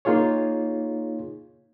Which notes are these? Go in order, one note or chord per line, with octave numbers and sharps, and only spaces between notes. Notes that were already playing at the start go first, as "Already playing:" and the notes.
A#3 D#4 F4 G#4 C#5